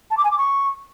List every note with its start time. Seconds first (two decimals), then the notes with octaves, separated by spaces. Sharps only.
0.10 A5
0.17 D6
0.24 G#5
0.31 D6
0.38 C#6